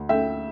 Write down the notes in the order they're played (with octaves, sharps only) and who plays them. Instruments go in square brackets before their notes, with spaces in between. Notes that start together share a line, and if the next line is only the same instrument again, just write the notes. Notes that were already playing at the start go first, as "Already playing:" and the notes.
Already playing: [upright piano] D2
A3 E5 G5